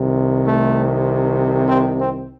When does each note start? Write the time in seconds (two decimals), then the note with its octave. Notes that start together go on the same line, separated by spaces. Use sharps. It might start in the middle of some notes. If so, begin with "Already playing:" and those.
Already playing: C2 C3 D#3
0.45 A3
1.67 C4
1.98 C4